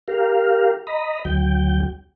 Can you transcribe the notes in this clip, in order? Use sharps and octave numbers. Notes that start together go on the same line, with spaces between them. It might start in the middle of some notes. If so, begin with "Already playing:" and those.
G4 A#4 F5
D#5 A#5 B5
D2 F#3 G5